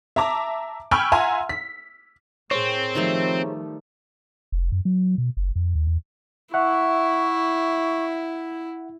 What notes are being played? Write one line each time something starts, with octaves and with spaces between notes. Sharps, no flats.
E5 A5 A#5 D6
G5 G#5 B5 C#6 E6 F6
F4 E5 F#5 G#5 A#5 C6
B6
A2 C4 G#4 A#4 C5 C#5
D#3 F3 G3 A3
F1
F#2
F#3
B2
F#1
F2
D#2
E2
E4 E5 F#5 C#6